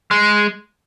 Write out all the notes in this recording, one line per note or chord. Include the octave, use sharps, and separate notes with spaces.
G#3